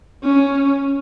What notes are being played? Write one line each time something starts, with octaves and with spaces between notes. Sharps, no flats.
C#4